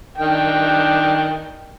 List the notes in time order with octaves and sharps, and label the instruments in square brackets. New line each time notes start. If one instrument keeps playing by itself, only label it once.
[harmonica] D#3 D4 G5